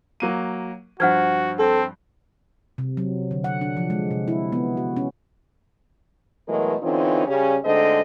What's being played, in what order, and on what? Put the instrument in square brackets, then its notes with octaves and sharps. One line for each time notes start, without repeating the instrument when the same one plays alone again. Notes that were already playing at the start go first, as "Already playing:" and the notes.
[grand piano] F#3 A#3 D#7
[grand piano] G2 F3 [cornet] F#4 [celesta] F#5 F6 G#6
[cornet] C4 [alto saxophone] A4
[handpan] C3
F#3
D3
F#5
D4
F3
G#3
C3
E4
B3
F#4
C#4
[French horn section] B2 E3 F#3 G#3 A3 A#4
D3 E3 C4 C#4 D#4 F4
C#3 G3 C#4
D2 G#2 D3 C4 A4 D#5